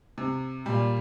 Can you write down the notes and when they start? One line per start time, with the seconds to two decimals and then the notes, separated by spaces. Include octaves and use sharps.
0.18 C3
0.66 A#2 G3